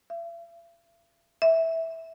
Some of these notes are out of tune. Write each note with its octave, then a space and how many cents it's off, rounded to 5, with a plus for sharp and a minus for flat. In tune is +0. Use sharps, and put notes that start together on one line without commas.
E5 +45
E5 -10